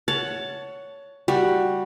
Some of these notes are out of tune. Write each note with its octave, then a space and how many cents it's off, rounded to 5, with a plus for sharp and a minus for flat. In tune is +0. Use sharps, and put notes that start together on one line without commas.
C#5 +15 F#5 +0 A5 +0
G3 +0 F#4 +0